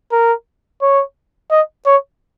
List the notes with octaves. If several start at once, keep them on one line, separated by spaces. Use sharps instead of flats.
A#4
C#5
D#5
C#5